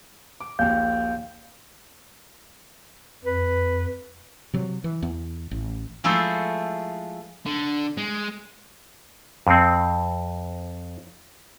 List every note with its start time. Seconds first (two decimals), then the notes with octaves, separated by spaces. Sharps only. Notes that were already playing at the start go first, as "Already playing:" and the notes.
0.40 D6
0.59 A#1 D#2 F5 G6
3.25 F2 B4
4.54 C3 F#3
4.84 E3
5.03 E2
5.51 A1
6.04 F3 G#3 A3 E4 A4 C5
7.46 D3
7.97 G#3
9.47 F2 C4